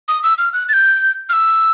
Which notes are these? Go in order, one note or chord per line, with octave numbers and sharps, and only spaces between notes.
D#6
E6
F6
F#6
A6
G6
F6
E6